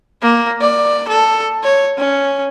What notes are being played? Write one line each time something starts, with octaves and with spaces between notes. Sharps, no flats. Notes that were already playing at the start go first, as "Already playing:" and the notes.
A#3
D5
A4
C#5
C#4